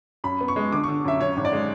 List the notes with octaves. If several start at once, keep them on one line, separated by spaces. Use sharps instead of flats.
F#2 B5
B3
C#6
G#3
D3 D6
D3 C#6
F#2 E5
F#2 C#5
G#1
D5
G#3